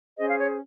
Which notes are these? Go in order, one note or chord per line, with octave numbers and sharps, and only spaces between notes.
C#4 G#4 C5 D#5
F5
C#5